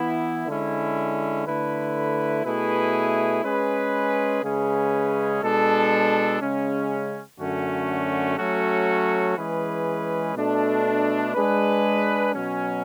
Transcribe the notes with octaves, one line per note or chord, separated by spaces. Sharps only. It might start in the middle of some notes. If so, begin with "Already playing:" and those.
Already playing: E3 B3 E4
D3 G#3 C#4 E4
D3 A3 E4 B4
B2 A3 E4 G#4 B4
G#3 C#4 G#4 B4
C#3 G#3 C#4 G#4 B4
B2 G#3 D4 A4
C#3 G#3 C#4
F#2 D3 A3 C#4 F#4
F#3 A3 C#4 F#4 A4
E3 G#3 C#4 G#4 B4
B2 A3 D4 A4
G#3 D4 G#4 B4
B2 F#3 C#4